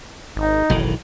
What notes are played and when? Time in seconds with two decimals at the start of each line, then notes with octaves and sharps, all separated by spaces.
0.36 G#1 D#4
0.70 F#1 B1 D#3 E3